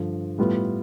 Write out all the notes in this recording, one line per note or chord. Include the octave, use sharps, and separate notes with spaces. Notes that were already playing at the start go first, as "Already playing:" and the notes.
Already playing: G2 D3 F3
A2 G3 B3 F4